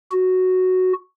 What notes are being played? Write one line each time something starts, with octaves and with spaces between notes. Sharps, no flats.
F#4